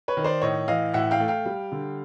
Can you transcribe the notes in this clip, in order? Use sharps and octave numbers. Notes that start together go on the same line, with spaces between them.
B4 C#5
D#3
C5 D5
A2 C#5 D#5
E3 D#5 F5
A2 E5 F#5
F5 G5
A3
F5 G5
G3
D3